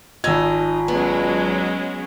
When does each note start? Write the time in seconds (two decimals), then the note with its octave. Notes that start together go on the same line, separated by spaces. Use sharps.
0.24 G#1 D#4 F4 G#5 A5 E6 G#6
0.88 F#3 G#3 B3 C#4